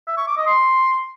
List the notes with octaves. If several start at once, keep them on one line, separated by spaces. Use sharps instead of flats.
E5
C#6
D6
D#5
C6